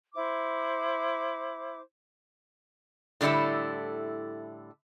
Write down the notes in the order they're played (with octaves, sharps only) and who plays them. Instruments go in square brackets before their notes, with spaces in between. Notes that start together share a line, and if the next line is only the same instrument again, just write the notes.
[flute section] E4 C5 D6
[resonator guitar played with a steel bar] A2 D3 G3 E4 A4 E5